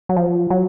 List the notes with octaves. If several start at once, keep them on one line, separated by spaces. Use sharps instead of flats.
F#3
F3
F#3